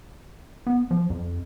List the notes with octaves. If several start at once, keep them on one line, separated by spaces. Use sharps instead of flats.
B3
F3
F2